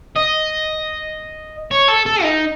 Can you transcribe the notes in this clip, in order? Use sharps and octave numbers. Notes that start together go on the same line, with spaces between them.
D#5
C#5
A4
A4
D#4